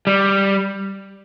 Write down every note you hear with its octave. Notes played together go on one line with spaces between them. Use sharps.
G3